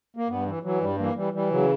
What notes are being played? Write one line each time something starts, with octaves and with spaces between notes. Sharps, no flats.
A#3
G2 B3
E3
E3 F#3
G2 G3
E3 A#3
E3 G3
E3 G3
C#3 F#3